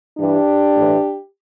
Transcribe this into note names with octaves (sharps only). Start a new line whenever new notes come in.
G2 E3 D4 G4
A2 E3